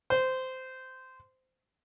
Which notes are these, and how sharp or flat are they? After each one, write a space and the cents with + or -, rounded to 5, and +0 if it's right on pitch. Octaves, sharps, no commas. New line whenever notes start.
C5 -15